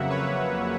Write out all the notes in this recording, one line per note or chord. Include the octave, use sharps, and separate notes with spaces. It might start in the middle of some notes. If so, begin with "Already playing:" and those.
Already playing: F2 C#3 F#3 A#3 E5 F#5
B4 C#5